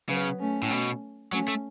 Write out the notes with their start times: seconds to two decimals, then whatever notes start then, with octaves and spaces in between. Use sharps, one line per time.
0.09 C#3 F#3 B3
0.40 A3 C#4
0.63 A2
0.71 B2
1.32 F#3 A3 C#4
1.48 A3